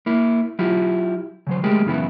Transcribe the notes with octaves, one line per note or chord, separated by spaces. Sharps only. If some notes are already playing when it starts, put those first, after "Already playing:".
A#3 E4
F#3 E4 F4 G4
C#3 F#3 C5
G#3 A3 G4 G#4 A#4
F#2 C#3 E3 B3 E4